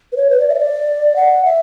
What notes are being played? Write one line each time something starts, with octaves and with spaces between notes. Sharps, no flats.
B4
C#5
B4
D5
E5
C#5
D5
F#5
E5